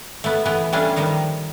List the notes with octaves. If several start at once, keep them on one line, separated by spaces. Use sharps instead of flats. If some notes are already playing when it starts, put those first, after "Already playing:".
A3 B3
E3 A3 B3
G3 A3 C#4 D4 F4
D#3 F3 G3 D#4